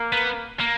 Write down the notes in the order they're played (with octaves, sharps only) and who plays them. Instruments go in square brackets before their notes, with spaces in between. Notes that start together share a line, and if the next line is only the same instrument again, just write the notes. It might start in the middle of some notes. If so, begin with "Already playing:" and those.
Already playing: [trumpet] A#3
[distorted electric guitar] B3
A#3